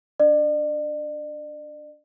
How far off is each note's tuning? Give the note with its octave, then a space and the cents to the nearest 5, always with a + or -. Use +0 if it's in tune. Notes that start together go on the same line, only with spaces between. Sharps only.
D4 -15 D5 +40